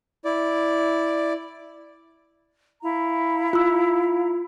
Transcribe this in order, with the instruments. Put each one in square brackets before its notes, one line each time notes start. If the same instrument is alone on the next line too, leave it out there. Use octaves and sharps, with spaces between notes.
[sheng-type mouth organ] E4 D5
[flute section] E4 F5 A#5
[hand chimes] F4 E6